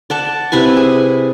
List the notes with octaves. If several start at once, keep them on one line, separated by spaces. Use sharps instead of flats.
D5 F#5 A5
C3 E4 B4 G#5
G#4